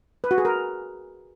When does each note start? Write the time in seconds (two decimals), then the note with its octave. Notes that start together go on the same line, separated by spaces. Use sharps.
0.24 B4
0.31 F#4
0.38 G#4
0.45 A#4